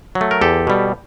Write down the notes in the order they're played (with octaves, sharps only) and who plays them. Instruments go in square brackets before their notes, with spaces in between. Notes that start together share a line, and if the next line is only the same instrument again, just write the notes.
[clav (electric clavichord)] F#3
A3
A#4
E2 G4 A4
B2 G3